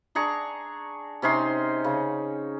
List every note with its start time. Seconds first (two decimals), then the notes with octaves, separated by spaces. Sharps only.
0.15 D4 G#4 A#5 C#6
1.22 C3 C#4 D#4 C6
1.84 C#3